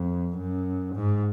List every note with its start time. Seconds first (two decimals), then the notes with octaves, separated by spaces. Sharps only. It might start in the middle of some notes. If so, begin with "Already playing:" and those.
Already playing: F2
0.37 F#2
0.95 G#2